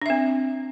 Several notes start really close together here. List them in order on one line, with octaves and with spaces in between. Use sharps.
D4 E5 C4